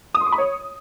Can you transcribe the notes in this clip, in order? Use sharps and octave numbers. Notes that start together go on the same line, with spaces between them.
D#6
C6
D6
B5
C#5